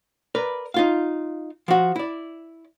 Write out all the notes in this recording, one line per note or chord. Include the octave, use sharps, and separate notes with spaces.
A#4 B4 D5
D#4 F4 F5
F3 F#4
E4 D5